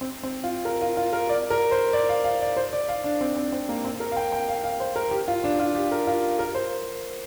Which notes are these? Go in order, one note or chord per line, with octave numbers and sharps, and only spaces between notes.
C4
C4
F4
A#4
F4
F4
A#4
D5
A#4
C5
D5
F5
F5
D5
C5
D5
F5
D4
C4
C4
C4
A#3
C4
A#4
F5
G5
G5
F5
F5
C5
A#4
G4
F4
D4
F4
G4
A#4
F4
A#4
C5